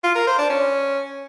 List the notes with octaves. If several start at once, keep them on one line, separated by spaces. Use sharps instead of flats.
F4
A#4
C5
D4
C#4